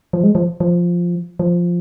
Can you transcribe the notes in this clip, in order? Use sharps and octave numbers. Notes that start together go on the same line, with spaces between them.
F3
G#3
F3
F3
F3